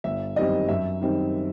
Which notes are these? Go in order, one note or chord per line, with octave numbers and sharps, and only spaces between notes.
G1 E5
F#2 D#3 G3 C4 D#5
F#2 E5
D#3 G3 C4 D#4